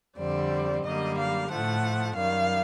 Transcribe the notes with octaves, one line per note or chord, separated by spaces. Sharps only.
F2 D3 G3 C4 D5
F#2 D3 G3 A#3 D#5
F5
A2 F3 A3 F#5
F#2 D#3 G3 F5